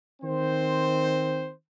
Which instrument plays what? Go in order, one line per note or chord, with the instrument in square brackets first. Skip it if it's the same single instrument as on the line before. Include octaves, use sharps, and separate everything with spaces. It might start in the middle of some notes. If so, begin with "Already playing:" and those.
[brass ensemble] D#3 C4 C5